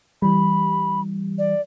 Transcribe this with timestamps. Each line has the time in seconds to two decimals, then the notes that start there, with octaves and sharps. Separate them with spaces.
0.22 E3 G3 B5
1.38 D5